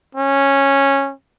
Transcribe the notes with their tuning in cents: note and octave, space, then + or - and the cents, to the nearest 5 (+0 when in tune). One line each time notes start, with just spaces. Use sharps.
C#4 -10